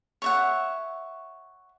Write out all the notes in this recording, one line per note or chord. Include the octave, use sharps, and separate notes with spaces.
C#5 E5 F#5